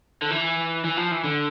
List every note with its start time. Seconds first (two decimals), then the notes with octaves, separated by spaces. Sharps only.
0.22 D3
0.31 E3
0.85 E3
0.97 F3
1.11 E3
1.24 D3